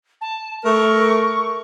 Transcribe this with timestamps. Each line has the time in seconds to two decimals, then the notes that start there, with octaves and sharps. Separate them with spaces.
0.21 A5
0.65 A3 A#4 C#6